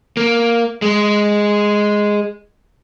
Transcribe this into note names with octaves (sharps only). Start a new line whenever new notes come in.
A#3
G#3